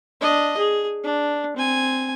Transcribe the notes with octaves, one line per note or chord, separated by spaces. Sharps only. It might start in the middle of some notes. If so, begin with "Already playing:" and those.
D4 D#5
G#4
D4
C4 G#5